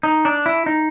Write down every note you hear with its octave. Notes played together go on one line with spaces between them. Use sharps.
D#4
D4
E4
D#4